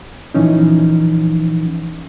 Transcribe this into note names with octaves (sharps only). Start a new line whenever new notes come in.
A#2 E3 F3 C#4 D#4